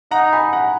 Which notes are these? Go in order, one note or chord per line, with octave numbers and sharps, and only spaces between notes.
D#4 F#5 A#5
G#5 B5
F#5 A#5